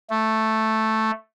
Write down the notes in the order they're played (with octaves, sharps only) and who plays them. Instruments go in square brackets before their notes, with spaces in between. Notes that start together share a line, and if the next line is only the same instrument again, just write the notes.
[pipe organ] A3